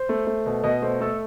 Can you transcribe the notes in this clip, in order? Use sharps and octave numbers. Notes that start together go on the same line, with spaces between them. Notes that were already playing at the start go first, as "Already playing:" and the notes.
Already playing: C5
A3
A3
B2
B2 D#5
A3 C5
A3 A4